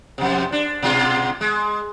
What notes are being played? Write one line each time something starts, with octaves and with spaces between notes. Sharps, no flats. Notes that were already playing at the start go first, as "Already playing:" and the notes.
F2 C3
D4
B2 G#3 F4
G#3